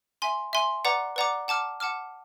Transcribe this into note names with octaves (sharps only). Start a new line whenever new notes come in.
E5 G#5 C6
E5 G#5 C6
B4 D5 F#5 A#5 D6
B4 D5 F#5 A#5 D6
F#5 A5 D6 F6
F#5 A5 D6 F6